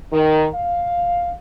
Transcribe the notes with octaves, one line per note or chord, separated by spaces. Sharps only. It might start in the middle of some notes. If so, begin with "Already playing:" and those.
D#3
F5